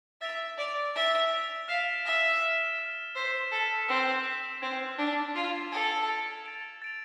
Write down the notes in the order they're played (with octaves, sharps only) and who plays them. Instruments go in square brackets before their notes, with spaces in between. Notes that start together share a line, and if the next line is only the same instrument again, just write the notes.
[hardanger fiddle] E5 [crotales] A6 D7 F7
[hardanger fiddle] D5 [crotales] A6 D7 F7
[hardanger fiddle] E5 [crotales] A6 D7 F7
[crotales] A6 D7 F7
[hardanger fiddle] F5 [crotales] F6 B6 E7
[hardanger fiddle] E5 [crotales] F6 B6 E7
[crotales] F6 B6 E7
F6 B6 E7
[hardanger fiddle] C5 [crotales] E6 B6 E7
[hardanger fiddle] A4 [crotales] E6 B6 E7
[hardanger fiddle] C4 [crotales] E6 B6 E7
[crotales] E6 B6 E7
[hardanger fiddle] C4 [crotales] G#6 D7 F7
[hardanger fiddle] D4 [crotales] G#6 D7 F7
[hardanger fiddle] F4 [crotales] G#6 D7 F7
[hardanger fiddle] A4 [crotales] G#6 D7 F7
[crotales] A6 D7 F7
A6 D7 F7
A6 D7 F7